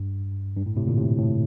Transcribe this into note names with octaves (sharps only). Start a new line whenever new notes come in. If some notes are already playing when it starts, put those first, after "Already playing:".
Already playing: G2
G2
A2
A2 C3
A#2 D3
A2 C3
A2